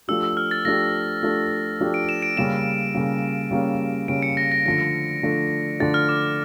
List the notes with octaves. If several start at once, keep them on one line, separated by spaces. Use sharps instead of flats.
F3 A3 D4 G4 E6
E6
F6
A6
F3 A3 D4 G4 A#6
F3 A3 D4 G4
F3 A3 D4 G4
D7
E7
D7
C#3 G3 A#3 C#4 E7
C#3 G3 A#3 C#4
C#3 G3 A#3 C#4
C#3 G3 A#3 C#4 D7
C#7
A#6
A#6
D3 F3 A3 D4 A#6
D3 F3 A3 D4
D3 F3 A3 D4 A6
F6
D6